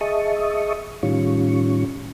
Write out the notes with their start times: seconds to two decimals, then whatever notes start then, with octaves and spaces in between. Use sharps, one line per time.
0.01 G#4 D#5 E5 A5 C#6 D#6
1.03 A2 D#3 G3 C#4 F4 C#6